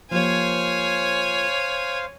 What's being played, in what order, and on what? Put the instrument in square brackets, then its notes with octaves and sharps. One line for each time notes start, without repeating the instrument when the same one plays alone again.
[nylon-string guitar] F3 A#3 G4 [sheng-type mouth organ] C5 F5 [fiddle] C#5 G#5